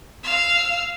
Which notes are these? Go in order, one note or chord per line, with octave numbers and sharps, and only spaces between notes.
F5 E6